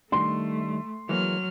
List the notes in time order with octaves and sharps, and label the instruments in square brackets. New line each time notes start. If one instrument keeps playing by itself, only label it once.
[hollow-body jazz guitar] D#3 G3 D4 [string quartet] A3 [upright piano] C6
[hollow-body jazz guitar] E3 G#3 A#3 [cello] F#3 [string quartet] F6